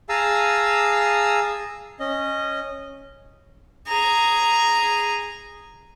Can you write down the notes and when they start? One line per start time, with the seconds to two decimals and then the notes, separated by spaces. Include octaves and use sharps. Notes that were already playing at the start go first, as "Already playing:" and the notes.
0.09 G#4 F5 A5 A#5 D#6 E6
2.00 C#4 D#5
3.88 G#4 A#5